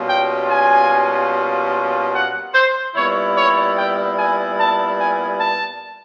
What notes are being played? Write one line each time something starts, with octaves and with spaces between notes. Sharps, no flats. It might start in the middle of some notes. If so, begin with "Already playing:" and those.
Already playing: B2 G3 A#3 C#4 F4
G5
G#5
F#5
C5
A#2 G3 B3 E4 C#5
C#5
G5
G#5
A5
G#5
A5